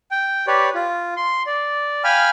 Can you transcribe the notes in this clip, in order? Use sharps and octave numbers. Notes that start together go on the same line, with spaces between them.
G5
G4 B4 C#5 D5
F4
C6
D5
F5 G5 G#5 B5 F6